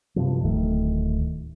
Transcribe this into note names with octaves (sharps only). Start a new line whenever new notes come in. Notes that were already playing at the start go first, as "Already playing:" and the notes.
G2 C3 F3
D1 D#3 A3